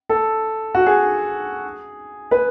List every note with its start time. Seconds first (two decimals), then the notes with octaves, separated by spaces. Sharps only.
0.09 A4
0.75 F#4
0.86 G#4
2.31 B4